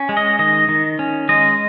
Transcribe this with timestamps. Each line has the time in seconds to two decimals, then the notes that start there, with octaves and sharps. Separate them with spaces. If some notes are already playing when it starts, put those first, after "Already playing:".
Already playing: C#4
0.09 G#3
0.17 D#5
0.39 D#3 D#5
0.69 D#3
0.99 C#4
1.29 G#3 D#5